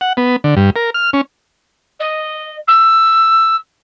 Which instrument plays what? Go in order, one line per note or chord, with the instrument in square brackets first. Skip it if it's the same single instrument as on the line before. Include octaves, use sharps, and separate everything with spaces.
[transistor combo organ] F#5
B3
D3
G2
A#4
F6
C#4
[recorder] D#5
E6